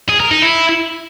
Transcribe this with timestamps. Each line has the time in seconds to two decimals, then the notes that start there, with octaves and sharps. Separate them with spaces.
0.09 G#4
0.20 A#4
0.31 D#4
0.42 E4